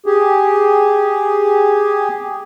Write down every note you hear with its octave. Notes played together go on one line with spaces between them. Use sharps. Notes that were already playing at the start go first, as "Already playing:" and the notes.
G4 G#4